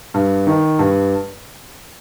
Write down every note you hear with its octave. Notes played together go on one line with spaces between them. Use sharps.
G2
D#3
G2